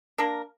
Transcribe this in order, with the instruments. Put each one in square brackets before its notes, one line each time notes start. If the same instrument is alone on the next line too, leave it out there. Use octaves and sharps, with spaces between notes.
[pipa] A#3 D4 A#4